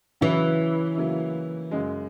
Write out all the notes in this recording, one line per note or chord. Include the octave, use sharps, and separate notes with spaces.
C#3 E3 F#3 C#4 E4
C#3 F#3 A#3 E4
F#2 C#3 G#3